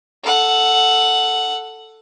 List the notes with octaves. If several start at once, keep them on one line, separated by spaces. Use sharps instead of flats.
A4 F#5